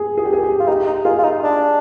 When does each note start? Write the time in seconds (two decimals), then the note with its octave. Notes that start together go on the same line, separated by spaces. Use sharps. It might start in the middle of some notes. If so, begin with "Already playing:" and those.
Already playing: G#4
0.18 G#4
0.25 G4
0.33 G#4
0.43 G4
0.60 F4
0.67 D#4 G4
0.86 D#4
1.05 F4 G#4
1.18 F4
1.24 D#4
1.44 D4